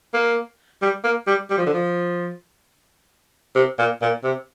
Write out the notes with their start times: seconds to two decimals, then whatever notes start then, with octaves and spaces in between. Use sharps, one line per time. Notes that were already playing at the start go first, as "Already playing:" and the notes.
0.14 A#3
0.82 G3
1.04 A#3
1.27 G3
1.50 G3
1.58 F3
1.66 D3
1.74 F3
3.55 C3
3.79 A#2
4.02 A#2
4.24 C3